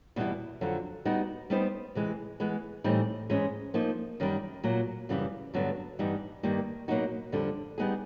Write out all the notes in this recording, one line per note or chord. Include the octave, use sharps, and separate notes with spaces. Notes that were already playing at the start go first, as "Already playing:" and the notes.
E2 B2 G3 B3 E4
F2 D3 F#3
G3 B3 D#4 F#4
G3 B3 D#4 G4 C5
C3 E3 G#3
E3 G#3 B3
A2 E3 G3 C4 D#4
G#2 E3 G#3 C#4
F3 A#3 D#4
F#2 D#3 G3
A#2 F#3 A#3
F#2 C#3 E3 G3
G2 D3 F#3 B3
G2 E3 G3 B3 D#4
G2 D#3 G3 A#3
B2 F#3 A#3 D#4 F#4
F2 D3 G3
G3 B3 D#4 G#4